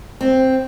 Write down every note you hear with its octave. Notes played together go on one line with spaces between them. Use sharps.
C4